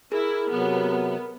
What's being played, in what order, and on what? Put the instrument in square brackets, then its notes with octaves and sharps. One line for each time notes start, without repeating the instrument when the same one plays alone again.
[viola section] E4 [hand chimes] G#4 [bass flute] A#4
[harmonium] C3 F#3 [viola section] B3